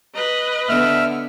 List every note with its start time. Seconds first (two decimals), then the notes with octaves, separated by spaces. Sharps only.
0.15 B4 D#5
0.69 D3 B3 E5 F6